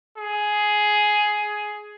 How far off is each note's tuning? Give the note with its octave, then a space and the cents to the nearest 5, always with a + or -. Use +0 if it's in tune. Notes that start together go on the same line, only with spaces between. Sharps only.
G#4 +10